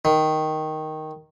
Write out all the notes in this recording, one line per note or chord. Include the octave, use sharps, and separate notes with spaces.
D#3